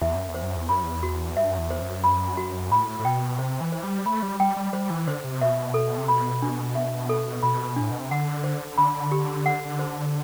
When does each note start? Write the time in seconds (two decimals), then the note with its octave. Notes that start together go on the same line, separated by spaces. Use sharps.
0.01 E2 E5
0.15 F#2
0.29 E2
0.34 C5
0.42 F#2
0.56 E2
0.69 F#2 B5
0.83 E2
1.03 F#4
1.36 G2 E5
1.51 F#2
1.58 E2
1.70 C5
1.82 F#2
2.04 B5
2.37 F#4
2.71 A2 B5
3.00 A2
3.05 B2 G5
3.38 C3 C5
3.61 E3
3.72 C5
3.83 G3
4.06 A3 B5
4.22 G3
4.40 G3 G5
4.57 G3
4.73 G3 C5
4.90 E3
5.07 D3 C5
5.24 C3
5.41 B2 E5
5.74 A4
5.98 C3
6.08 B2 B5
6.42 D4
6.75 E5
7.09 A4
7.43 B2 B5
7.76 A2 D4
7.91 B2
8.00 C3
8.11 D3 F#5
8.44 C5
8.78 D3 B5
9.12 G4
9.46 F#5
9.79 C5